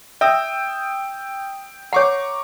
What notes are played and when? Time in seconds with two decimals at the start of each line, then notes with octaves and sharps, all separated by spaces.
0.21 E5 G5 D#6 E6
1.93 C#5 F#5 A#5 C#6 D6